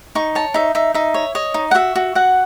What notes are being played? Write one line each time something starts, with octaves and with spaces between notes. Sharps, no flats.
D#4 C#6
C#5 A5
D#4 E5
D#4 E5
D#4 E5
C#5
C#5 D#5
D#4
F#5
F#4 E5
F#4
F#4 F#5